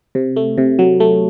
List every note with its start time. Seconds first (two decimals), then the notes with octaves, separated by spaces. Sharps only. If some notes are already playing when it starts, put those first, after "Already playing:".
0.15 C3
0.36 A3
0.58 C3
0.79 F#3
1.00 A3